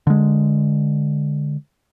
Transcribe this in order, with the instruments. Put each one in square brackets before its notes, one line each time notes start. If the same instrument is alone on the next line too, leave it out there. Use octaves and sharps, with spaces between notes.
[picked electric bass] D3 G#3